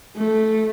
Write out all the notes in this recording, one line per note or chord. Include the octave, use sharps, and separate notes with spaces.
A3